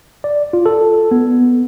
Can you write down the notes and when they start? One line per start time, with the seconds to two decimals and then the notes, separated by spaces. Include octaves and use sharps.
0.24 D5
0.53 F4
0.66 A4
1.11 B3